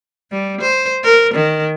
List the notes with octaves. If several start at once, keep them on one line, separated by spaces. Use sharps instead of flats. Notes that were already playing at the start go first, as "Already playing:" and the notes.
G3
C5
A#4
D#3